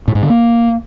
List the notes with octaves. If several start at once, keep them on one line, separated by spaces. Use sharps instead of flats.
A2
G#2
D3
A#3